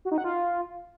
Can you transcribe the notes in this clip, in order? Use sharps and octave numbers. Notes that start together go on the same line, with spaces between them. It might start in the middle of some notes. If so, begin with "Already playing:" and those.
F#4
D#4
F#5
F4